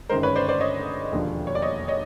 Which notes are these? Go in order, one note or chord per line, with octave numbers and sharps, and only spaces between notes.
G1 F#2 D#3 G#3 A#4 C5
B4 C#5
C5 D5
C5 D5
C#5 D#5
E1 D#2 D3 F3
C#5
D5
C#5 D#5
C#5 D#5